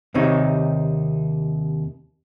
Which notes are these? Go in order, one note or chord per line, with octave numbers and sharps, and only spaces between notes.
D#2 C3 C4 D#4 C#5